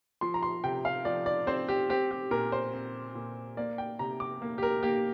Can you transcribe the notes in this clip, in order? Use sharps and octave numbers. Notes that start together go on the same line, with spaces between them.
F3 C6
A#5
C6
C3 G5
F5
F3 D5
D5
C4 C5
G4
C4 G4
G4
A#2 A#4
C5
C4
A#2
A#3 D5
G5
C3 A#5
D6
A#3
G4
A#4
A#3 G4